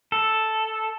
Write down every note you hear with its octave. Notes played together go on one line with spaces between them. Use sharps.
A4